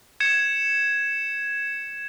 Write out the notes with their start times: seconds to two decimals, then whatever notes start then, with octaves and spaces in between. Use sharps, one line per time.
0.20 G#6 C#7 E7